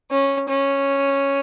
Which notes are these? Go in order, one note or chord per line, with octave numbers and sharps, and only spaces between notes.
C#4
C#4